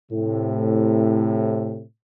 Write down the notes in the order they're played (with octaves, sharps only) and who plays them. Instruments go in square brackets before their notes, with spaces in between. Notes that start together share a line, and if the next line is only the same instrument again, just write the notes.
[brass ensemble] A2 C3